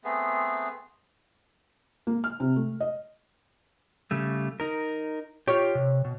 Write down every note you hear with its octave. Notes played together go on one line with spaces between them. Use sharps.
A3 B3 C4 G#4
A#3
F6
C3
A3
D#5
C#3 G3 A3
D#4 A#4
F4 G4 C#5
C3
B2